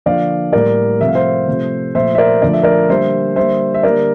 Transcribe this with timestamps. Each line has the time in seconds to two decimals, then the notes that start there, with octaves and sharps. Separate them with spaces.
0.06 D3 F3 A#3 D5 F5
0.53 A2 G3 A#3 A#4 D5
1.00 C3 F3 A3 E5
1.08 F5
1.15 C5 E5
1.48 C3 F3 A3
1.95 A#2 F3 A3 C5 E5
2.15 E5
2.18 A#4 D5
2.42 D3 F3 A3 D5
2.53 E5
2.63 A#4 D5
2.89 D3 G3 A#3 C5 E5
3.36 D3 G3 A#3 C5 E5
3.74 E5
3.83 D3 G3 A#3 A#4 D5